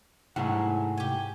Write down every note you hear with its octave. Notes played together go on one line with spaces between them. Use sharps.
G#2 C3 A3 E4 F#5
G4 G#5